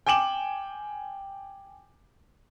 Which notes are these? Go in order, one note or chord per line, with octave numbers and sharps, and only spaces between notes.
G5 G#5 D6 E7 F#7